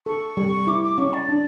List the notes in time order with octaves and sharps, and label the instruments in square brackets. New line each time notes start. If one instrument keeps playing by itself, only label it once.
[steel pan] A4 [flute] C#6
[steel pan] G3
[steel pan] E4 [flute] D6
[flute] D6
[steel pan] C#4 [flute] C#6
[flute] D5
[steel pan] D4